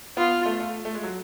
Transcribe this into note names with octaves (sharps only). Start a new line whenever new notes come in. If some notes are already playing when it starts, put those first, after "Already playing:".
B3 F4
A3
A3
A3
G#3
F#3